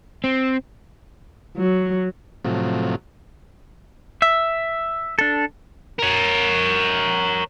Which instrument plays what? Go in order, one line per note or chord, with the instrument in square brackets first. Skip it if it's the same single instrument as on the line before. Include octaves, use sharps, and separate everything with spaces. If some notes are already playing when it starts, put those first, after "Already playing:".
[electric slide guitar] C4
[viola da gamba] F#3
[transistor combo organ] A2 C3 F3 F#3
[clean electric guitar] E5
[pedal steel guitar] D4 A4
[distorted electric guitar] A#4 C#5